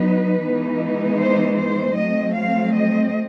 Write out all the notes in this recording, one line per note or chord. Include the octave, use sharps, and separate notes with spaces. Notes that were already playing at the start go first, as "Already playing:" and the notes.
Already playing: F#3 B3 D#4 B4
E3 G#3 B3 D#4
C5
C5
F#3 A3 C4 D#5
F5
D#5